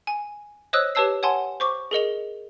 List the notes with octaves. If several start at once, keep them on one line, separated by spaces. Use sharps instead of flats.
G#5
C5 C#5 D#5 D#6 E6 F#6
G4 B4 C#5 A5 E6 C7
C#5 F#5 G#5 A5 C6
C5 C#6 D6
G#4 A#4 D#5 F7